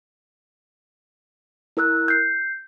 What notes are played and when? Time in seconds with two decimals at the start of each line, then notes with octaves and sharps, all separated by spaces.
1.77 E4 A#4 E6 F#6
2.08 G6 C7